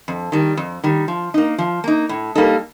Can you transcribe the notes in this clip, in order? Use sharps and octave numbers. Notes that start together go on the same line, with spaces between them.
F2
D#3 G3
F2
D#3 G3
F3
A#3 D#4
F3
A#3 D#4
A2
G3 A#3 D#4 A4